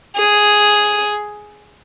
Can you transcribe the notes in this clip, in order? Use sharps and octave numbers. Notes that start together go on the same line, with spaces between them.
G#4